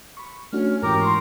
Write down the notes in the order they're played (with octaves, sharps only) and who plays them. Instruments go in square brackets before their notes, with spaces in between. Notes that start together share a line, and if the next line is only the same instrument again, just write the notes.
[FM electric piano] B5 C#6
[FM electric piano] A3 D4 F#4 [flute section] C#4 F6
[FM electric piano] G#2 E3 C#4 [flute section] G4 D6 [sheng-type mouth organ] A#4 A#5
[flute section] C6 C#6